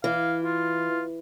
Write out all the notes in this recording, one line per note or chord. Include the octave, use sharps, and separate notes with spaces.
E3 F5
F4